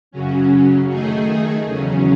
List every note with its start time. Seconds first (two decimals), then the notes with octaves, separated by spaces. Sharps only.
0.11 F#2 C#3 F#3 C#4
0.88 D#3 A3 D#4 G#4
1.66 E2 C#3 F#3 C#4